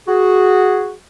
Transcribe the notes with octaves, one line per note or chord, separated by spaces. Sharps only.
F#4 G#4